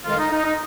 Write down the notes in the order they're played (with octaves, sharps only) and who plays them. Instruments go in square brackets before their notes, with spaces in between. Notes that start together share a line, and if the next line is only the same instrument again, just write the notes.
[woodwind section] F2 D#3 G#3 F4
D#4
D#4
D#4